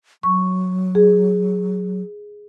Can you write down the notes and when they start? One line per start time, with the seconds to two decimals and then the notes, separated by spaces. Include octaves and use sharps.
0.23 F#3 C#6
0.95 G#4